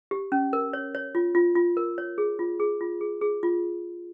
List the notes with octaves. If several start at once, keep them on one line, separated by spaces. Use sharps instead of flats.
G4
C#4
A#4
C#5
C#5
F4
F4
F4
A#4
C#5
G#4
F4
G#4
F4
G#4
G#4
F4